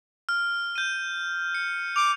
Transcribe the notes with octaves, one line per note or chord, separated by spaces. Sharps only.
F6
G6 D#7
C#7
D6 F7